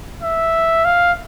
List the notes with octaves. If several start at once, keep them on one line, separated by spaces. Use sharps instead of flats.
E5
F5